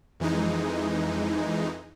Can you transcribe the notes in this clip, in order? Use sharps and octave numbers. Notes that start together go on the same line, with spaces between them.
F2 E3 G#3 D#4